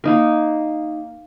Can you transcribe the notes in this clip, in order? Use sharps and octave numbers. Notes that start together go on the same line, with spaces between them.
A#3 D#4 A#4